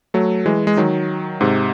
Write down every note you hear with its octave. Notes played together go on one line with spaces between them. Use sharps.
F#3 A3
E3 G#3
G#3
D#3 F#3
G#2 C3